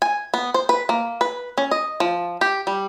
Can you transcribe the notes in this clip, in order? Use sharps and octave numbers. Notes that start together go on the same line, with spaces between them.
G#5
B3
C5
B4
A#3
B4
C#4
D#5
F3
G4
G3